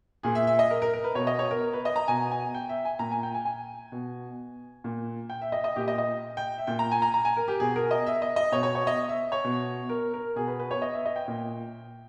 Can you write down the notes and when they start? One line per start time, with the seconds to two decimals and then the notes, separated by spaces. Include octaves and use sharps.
0.23 A#2 G#4
0.35 E5
0.47 E5
0.59 D#5
0.70 A#4
0.82 A#4
0.93 A#4
1.04 B4
1.15 B2 C#5
1.27 D#5
1.39 C#5
1.51 A#4
1.73 B4
1.85 D#5
1.96 A#5
2.08 B2 G#5
2.31 G#5
2.54 G5
2.69 E5
2.85 G#5
2.99 A#2 A#5
3.11 G#5
3.23 G5
3.34 G#5
3.45 G#5
3.92 B2
4.84 A#2
5.30 G5
5.42 E5
5.52 D#5
5.64 D#5
5.76 A#2 G4
5.88 D#5
5.98 D#5
6.37 G5
6.58 E5
6.67 A#2 G5
6.79 A#5
6.91 G#5
7.02 A#5
7.14 A#5
7.25 G#5
7.37 A#4
7.48 G4
7.60 B2 G#4
7.76 A#4
7.91 D#5
8.06 E5
8.22 D#5
8.36 D#5
8.52 B2 C#5
8.63 C#5
8.75 C#5
8.87 D#5
9.09 E5
9.32 C#5
9.44 B2
9.89 A#4
10.13 A#4
10.36 B2 G#4
10.47 B4
10.59 B4
10.71 C#5
10.82 D#5
10.93 E5
11.05 D#5
11.16 G5
11.28 A#2